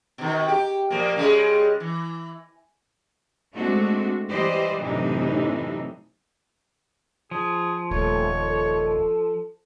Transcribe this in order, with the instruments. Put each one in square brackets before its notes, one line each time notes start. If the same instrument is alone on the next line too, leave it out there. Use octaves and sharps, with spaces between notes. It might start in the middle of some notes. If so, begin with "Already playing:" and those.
[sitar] B2 D#3
G4
A#2 F3 A#3
C#3 G3 G#3
E3
[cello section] G#3 A3 C4 D4 F#4
E3 G3 G4 C5 D5 D#5
F#2 A2 C3 E3 D4 D#4
[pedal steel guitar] F3 [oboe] G#4
[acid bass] D#1 [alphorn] A3 [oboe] C#5
[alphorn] A4